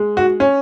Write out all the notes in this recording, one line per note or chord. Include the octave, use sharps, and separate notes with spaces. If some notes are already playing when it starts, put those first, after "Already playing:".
Already playing: G#3
F#4
C#4